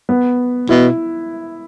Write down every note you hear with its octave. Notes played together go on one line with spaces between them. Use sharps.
B3
B2 E4